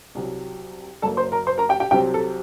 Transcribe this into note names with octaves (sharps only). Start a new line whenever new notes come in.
C2 C3 F#3
F#1 F#2 F#3 A#3 A4 A5
C5 C6
A#4 A#5
C5 C6
A#4 A#5
G4 G5
G4 G5
C2 C3 F#3 C4 G4 G5
A4